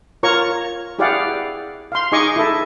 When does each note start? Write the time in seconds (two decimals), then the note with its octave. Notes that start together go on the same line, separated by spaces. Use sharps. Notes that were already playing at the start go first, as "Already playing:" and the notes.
0.23 F4 A#4 C#5 A#5 C#6
0.99 E4 G4 G#4 D5 F5 F#5
1.92 F5 C6
2.12 D#4 G#4 D#5 G#5 C#6 D6
2.36 E4 A4